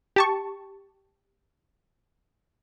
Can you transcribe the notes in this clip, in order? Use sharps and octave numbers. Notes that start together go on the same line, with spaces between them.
G4 A5 C#6